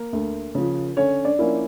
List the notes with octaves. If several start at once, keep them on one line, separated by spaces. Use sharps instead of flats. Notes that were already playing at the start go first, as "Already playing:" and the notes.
Already playing: A#3 A#4
D2
C#3 F3
D3 C#4 C#5
D4 D5
F3 A#3 C#4 E4